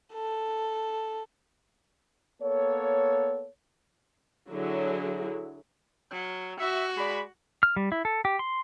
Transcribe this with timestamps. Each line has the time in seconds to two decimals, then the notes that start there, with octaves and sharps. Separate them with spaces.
0.13 A4
2.41 A#3 B3 A4 C#5
4.50 D3 F#3 E4 G#4
6.11 F#3
6.60 F#4 E5
6.97 G#3 D5 B5
7.63 F6
7.76 G3
7.92 E4
8.05 A4
8.25 G4
8.39 C6